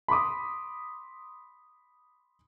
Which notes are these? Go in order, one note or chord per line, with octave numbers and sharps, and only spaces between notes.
B5 C6 D6 D#6